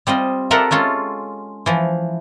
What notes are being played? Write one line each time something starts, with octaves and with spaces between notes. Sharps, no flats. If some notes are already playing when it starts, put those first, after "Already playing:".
G3 C4 F4 D#5
F4 A4 A#4 D5 E5 F#5
G#3 C#4 F4 A4
E3 F3